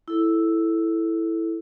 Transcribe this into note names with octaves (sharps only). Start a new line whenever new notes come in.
E4 A4